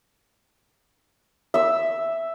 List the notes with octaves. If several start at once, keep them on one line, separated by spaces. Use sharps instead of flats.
E5 E6